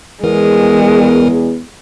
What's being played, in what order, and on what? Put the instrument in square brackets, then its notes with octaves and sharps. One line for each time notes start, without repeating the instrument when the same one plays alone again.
[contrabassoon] E2 [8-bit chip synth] E3 B3 A#4 [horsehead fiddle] G#3